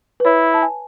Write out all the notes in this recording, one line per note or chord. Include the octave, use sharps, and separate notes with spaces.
B4
E4 C#5
A5
G#5